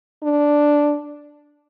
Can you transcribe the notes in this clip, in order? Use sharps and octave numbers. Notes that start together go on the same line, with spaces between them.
D4